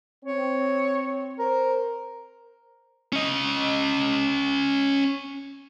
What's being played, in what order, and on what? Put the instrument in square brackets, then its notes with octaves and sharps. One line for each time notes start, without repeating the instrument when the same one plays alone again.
[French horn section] C4 [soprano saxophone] C#5
[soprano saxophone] A#4 [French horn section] C5
[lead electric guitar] C#4 D#5